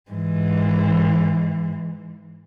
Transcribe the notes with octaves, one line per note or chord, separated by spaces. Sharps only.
G#2 E3